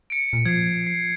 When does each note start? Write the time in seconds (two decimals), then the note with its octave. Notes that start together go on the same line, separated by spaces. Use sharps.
0.10 C#7 D7
0.33 A#2
0.45 F3 G#6 C7
0.87 C7